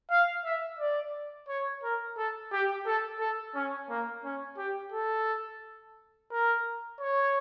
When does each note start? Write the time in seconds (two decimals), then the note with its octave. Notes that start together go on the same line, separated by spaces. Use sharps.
0.10 F5
0.45 E5
0.79 D5
1.48 C#5
1.83 A#4
2.17 A4
2.52 G4
2.86 A4
3.20 A4
3.55 C#4
3.89 A#3
4.24 C#4
4.58 G4
4.93 A4
6.31 A#4
7.00 C#5